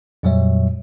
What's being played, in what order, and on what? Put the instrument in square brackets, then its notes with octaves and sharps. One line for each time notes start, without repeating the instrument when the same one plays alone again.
[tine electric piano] F2 A#2 F#3 G3 C#5 E5